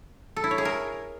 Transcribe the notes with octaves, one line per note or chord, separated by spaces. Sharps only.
A4
E4
C#5
G#4
A#4